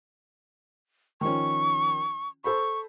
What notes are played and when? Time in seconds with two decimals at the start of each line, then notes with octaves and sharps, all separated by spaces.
1.21 D#3 F3 C#4 C#6
2.44 A4 C5 B5 C#6